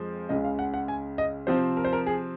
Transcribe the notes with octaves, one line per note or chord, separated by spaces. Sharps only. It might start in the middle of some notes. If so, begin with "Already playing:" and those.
Already playing: F2 F3 G#3 C4
C#2 C#3 G#3 D#5
F5
F#5
F#5
G#5
D#5
C3 F3 C4 C5
A#4
C5
A#4
G#4